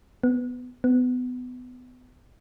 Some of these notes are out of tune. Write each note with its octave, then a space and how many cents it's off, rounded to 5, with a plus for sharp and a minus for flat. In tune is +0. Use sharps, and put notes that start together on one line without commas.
B3 +5
B3 +20